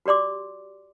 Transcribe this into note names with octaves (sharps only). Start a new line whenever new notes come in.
F#4 G4 D5 C6 D6